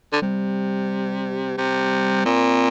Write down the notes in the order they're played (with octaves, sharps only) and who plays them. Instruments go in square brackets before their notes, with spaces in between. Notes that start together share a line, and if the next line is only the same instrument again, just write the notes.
[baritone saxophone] D3
[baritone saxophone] C3 [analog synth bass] G3
[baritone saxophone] C3
[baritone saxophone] A#2 [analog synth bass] C4